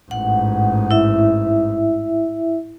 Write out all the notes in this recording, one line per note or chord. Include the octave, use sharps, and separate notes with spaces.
A1 G#2 F#5
E4 E5